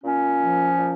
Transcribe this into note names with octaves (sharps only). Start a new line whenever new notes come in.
A#2 C#4
F3
A#2